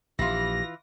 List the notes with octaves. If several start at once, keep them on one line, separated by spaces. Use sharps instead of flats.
A#1 E3 F4 G4 A#6